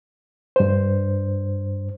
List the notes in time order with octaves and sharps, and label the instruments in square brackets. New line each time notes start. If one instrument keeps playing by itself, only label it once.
[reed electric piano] G2 C5